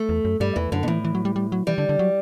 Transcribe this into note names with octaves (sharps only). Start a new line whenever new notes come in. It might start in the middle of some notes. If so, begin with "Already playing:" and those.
Already playing: A3
E2
F#2
G2 G3
E2 E3
F#2 D3
B2
A2 E3
E3
F#3
G3
G3
F#3
E3 G3
D3
D3
F#3